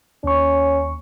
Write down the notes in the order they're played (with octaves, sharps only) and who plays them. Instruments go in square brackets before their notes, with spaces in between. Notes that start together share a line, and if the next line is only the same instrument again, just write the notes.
[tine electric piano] D#2 C#6 [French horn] C#4